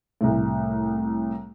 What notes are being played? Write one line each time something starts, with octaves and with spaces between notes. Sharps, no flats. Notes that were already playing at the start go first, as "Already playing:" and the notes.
C2 A2